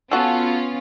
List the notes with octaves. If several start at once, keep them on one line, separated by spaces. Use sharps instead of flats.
B3 C#4 F4 F#4 A4